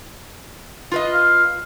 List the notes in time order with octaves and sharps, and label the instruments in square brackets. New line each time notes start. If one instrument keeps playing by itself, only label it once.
[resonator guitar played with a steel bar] F4 B4 D#5
[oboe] F5